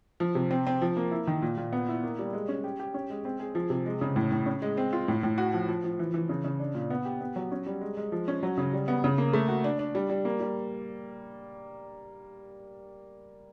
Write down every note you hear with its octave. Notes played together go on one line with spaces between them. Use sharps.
F3
C3
C4
C4
F3
A#3
E4
D#3
A#2
A#2
B3
E4
A#3
G3
G#3
C#4
G4
G4
C#4
G#3
C4
G#4
F3
C3
G#3
C#3
A2
A2
C#4
G#3
C4
F4
A2
A2
F#4
F3
F3
F3
E3
E3
C#3
C#3
D4
A#2
B3
G4
B3
F#3
C#4
G3
G#3
G#3
F3
C#4
F#3
C#3
G3
B3
C#3
A#3
A3
F#4
D4
D4
G3
G3
A#3
G3